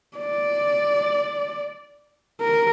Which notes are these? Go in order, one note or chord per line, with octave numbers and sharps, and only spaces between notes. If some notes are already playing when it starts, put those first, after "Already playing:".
D5
A#4